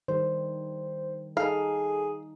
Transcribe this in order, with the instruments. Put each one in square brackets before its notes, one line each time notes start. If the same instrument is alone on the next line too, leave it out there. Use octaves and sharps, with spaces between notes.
[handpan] D#3 G3 [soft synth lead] C5
[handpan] D#4 [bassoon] G#4 [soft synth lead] A4 [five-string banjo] F5